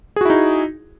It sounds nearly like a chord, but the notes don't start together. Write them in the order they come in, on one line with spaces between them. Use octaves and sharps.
G#4 F#4 E4 D#4